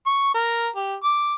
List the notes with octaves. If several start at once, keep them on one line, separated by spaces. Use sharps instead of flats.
C#6
A#4
G4
D6